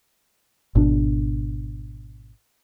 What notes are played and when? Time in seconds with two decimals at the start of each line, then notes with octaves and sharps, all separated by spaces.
0.75 G#1 B2 D4